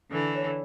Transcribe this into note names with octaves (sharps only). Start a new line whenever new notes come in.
D3 E3 A4
C#5